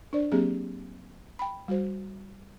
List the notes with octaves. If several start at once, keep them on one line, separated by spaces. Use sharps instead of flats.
D4 C5 D5
F#3 A#3 C4 G4 G#4
G5 B5
G3 F#4 C5